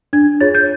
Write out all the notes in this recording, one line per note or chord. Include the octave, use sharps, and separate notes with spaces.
D4 G#6
F4 G#4 C#5 A6
G6